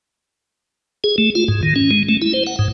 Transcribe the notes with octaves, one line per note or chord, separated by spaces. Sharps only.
G#4
A3
F4
G#2
D#3
C#4
G#3
A3
E4
C5
F#5
G#2